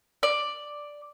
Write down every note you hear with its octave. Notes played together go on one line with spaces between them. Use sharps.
D5